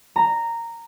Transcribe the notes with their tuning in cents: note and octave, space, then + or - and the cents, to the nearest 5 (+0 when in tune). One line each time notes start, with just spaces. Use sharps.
A#5 -10